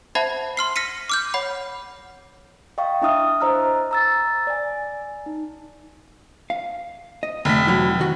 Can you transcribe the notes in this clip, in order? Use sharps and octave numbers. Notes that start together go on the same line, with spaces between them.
C5 E5 F#5 A5 B5 G#6
C6 F6 C7
F6 A#6 B6 C#7 D#7
D6 F6 G6
C#5 F#5 B5
D#5 F5 G5 C#6
D4 E4 E5 D#6 F6
C5 D#5 A#5 E6 F6
A#5 E6 A6
D5 G#5
D#4
F5
D#5
F1 D3 A3 B6
E3 F#3 E4
D#3 F#4